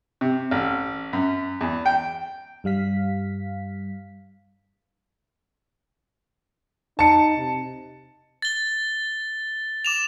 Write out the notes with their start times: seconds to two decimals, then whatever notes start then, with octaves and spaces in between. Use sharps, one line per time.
0.21 C3
0.51 A1
1.13 F#2
1.61 E2
1.86 G5
2.64 G2 G3 F5 B6
6.99 D#4 A5 C#7
7.38 C3
8.42 A6 G7
9.85 D6 E7 F7